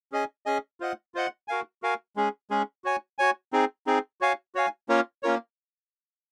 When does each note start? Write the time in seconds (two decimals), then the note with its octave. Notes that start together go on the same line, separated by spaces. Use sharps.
0.12 C#4 G#4 D#5 G#5
0.46 C#4 G#4 D#5 G#5
0.80 F4 C5 D#5 F#5
1.14 F4 C5 D#5 F#5
1.48 F#4 A#4 F5 G#5
1.82 F#4 A#4 F5 G#5
2.16 G#3 C#4 G#4
2.50 G#3 C#4 G#4
2.84 F#4 C#5 G#5
3.19 F#4 C#5 G#5
3.53 C4 D#4 G#4
3.87 C4 D#4 G#4
4.21 F#4 C#5 F5 G#5
4.55 F#4 C#5 F5 G#5
4.89 A#3 C#4 F4 A#4 C#5
5.23 A#3 C#4 F4 A#4 C#5